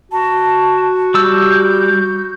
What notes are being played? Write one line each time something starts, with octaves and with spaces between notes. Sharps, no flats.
F#4 A5
G3 A5 E6 G6